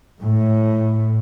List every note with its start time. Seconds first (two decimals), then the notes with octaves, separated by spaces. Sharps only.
0.20 A2